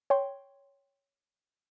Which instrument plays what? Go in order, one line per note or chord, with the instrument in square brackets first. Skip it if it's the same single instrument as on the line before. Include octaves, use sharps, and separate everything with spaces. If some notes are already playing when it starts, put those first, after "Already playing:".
[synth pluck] C#5 G5 C6